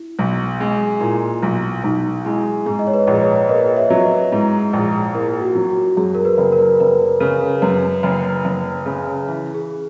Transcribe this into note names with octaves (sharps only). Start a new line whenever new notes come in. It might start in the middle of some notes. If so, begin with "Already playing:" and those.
Already playing: E4
B1
G#3
A#2 E4
B1
B1 D#4
G#3 E4
G#2 G#4
D#5
C#5
B4
A#1
C#5
A#3 B4 D#5
C#5 E5
F#3
B4 D#5
G#2 E4
A#1
A#3 E4
F#4
F#3
F#4
F#2 G#4
A#4
B4
F#1
A#4
F#1 B4
C#3
F#2 B4
F#1
F#1
C#3
E3
G#4